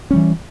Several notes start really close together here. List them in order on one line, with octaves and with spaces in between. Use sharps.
C#4 G3 E3